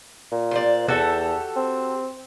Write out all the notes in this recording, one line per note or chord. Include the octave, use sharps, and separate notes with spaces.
A#2
C5 D5
E2 F#4 G4 A4
C4